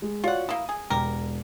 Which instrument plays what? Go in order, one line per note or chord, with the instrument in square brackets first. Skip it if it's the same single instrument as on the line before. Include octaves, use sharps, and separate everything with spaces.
[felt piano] G#3
[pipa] F4 F#5 [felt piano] F#4 C#5 D5
[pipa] A#3 E4 [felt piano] D#6
[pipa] G#4
[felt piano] E1 [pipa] G4 A#4